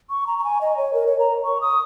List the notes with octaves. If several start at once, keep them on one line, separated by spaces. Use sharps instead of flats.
C#6
A#5
A#5
G#5
D#5
C#5
A#4
C#5
A#5
C#6
D#6